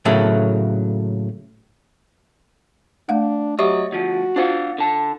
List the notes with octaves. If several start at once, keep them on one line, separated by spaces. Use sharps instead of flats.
A2 C#3 F#3 A3 A#3
A3 D4 F5 F#5
F#3 G4 C#5 D#5 E5 C#6
D2 F3 F#4
D4 F4 C5 F5 F#5
D3 A5